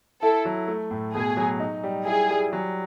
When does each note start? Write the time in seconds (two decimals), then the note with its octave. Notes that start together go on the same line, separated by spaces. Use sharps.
0.22 E4 A4
0.45 F#3
0.68 A3
0.91 A2
1.14 B2 G#4
1.37 F#3
1.60 D#4
1.83 G3
2.06 E4 G#4
2.30 G3
2.53 F#3